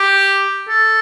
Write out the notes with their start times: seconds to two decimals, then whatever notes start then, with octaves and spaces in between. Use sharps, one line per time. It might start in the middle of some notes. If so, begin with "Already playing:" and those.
Already playing: G4
0.68 A4